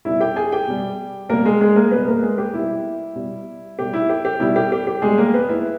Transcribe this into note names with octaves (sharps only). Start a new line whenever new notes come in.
B2 G3 E4 E5
G4 G5
G#4 G#5
G4 G5
B2 G3
B2 G3 A#3 A#4
G#3 G#4
G#3 G#4
A#3 A#4
B2 G3 B3 B4
A#3 A#4
G#3 G#4
G4
B2 G3 E4
B2 G3
B2 G3 G4
E4
G4
G4
B2 G3 E4
G4
G4
G4
B2 G3 G#3 G#4
A#3 A#4
B3 B4
E4 E5